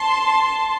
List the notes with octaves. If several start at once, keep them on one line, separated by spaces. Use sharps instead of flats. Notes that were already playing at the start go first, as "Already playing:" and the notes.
Already playing: A5 C6